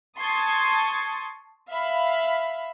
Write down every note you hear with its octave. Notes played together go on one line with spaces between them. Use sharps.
A5 C6 C#6 D#6 G#6 A6
E5 F5 B5